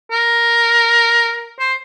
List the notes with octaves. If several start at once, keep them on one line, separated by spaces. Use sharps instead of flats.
A#4
C5